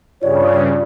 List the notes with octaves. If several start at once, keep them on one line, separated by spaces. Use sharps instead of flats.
G2 C#3 F4 C#5 D5